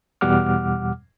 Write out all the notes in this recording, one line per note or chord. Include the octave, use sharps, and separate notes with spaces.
E2 B2 G3 F#5 D6 F6